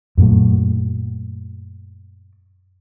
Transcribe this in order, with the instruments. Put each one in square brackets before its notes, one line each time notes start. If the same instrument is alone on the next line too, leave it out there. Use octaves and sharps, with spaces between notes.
[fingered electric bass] F#2 A#2 F#3 A3